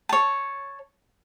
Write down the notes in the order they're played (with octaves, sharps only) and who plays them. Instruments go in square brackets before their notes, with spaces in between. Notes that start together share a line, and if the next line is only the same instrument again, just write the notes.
[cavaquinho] C#5 A5